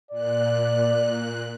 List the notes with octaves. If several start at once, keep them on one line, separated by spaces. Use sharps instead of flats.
A#2 D5 F#6